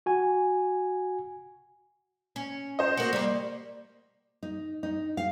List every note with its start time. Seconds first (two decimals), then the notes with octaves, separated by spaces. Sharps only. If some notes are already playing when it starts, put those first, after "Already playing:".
0.06 F#4 G#5
2.36 C#4
2.79 C5 D#5
2.97 A#3 F#4
3.13 G3 A#3
4.43 D#4
4.83 D#4
5.17 F5